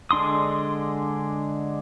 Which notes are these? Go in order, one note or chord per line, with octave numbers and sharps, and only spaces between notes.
D3 G#3 D4 C6 D#6